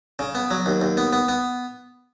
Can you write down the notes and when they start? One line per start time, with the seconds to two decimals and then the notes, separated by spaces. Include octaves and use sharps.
0.19 C#3
0.35 B3
0.51 F#3
0.66 D#2
0.81 D#2
0.97 B3
1.13 B3
1.28 B3